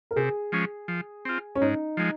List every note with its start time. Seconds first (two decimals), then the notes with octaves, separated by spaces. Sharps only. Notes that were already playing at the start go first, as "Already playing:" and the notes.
0.11 A#4
0.16 C3 G#4
0.52 F3 G#3 C#4
0.88 F3
1.25 C4 F4
1.55 C#4
1.61 G#2 D#4
1.97 F3 G#3